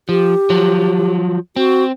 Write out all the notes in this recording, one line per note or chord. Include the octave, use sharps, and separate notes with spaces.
F3 G4
F3 F#3
C4 F#4